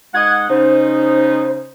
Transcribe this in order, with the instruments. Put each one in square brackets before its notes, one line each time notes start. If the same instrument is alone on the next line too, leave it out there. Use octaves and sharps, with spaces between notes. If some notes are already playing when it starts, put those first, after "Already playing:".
[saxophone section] G#2 D#5 F#5 [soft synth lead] G#6
[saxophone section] C#3 D#4 [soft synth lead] C5